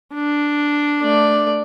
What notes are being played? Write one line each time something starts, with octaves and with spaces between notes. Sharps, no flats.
D4
A3 D5